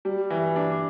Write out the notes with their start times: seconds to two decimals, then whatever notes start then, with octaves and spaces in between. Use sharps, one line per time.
0.05 G3
0.30 E3
0.56 D4